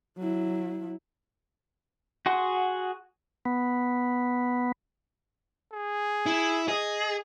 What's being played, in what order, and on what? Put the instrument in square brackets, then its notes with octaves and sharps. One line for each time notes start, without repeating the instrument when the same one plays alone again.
[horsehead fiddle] F#3 E4
[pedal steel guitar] F#4 G#4 F#5 C6
[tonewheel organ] B3
[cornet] G#4
[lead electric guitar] E4
[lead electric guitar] G#4 [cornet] D#5